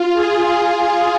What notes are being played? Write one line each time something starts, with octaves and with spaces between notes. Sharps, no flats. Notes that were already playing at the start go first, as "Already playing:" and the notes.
Already playing: F4
G#4